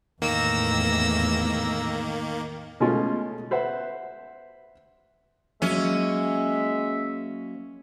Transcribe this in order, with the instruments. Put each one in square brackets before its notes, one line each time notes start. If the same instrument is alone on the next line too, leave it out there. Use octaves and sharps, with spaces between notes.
[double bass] E2 A2 [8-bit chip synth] D#3 A#3 [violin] E6 A#6
[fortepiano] B2 G#3 A3 C#4 F4
B4 C5 E5 F#5
[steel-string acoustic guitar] F#3 A#3 [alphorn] G#3 [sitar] C#4 [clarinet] E5